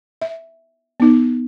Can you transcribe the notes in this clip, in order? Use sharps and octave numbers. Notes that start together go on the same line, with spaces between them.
E5
B3 D#4